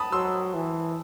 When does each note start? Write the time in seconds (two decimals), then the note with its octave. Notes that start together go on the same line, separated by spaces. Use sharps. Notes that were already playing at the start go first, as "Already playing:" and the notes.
Already playing: A5 B5 D#6
0.12 F#3 C6 E6
0.54 E3